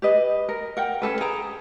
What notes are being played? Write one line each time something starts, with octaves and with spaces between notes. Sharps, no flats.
G4 B4 D#5
A#4
A#4 F#5 G5
C#4 D#4 A4 B4
G#4 G5 A#5